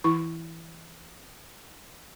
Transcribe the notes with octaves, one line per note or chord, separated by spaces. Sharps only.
E3 E4 C#6